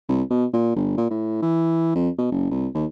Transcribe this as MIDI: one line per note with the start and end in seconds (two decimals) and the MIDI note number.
0.09 0.22 36
0.31 0.46 47
0.53 0.72 46
0.76 0.97 31
0.97 1.06 46
1.10 1.38 45
1.42 1.92 52
1.95 2.09 41
2.18 2.27 47
2.31 2.48 30
2.51 2.67 36
2.75 2.86 39